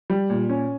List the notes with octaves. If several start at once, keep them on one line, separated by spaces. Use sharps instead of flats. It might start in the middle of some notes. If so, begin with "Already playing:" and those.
G3
A#2
C#4